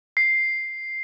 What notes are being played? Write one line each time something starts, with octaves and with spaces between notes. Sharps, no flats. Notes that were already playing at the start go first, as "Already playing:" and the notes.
C7